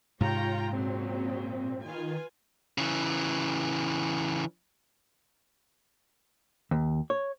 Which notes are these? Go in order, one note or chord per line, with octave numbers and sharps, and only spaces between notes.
G#2 C3 G#3 F4 C#5 G5 A#5
A#2 C#3 F#3 C4
D#3 F4 B4 G#5
C#3 E3
D#2
C#5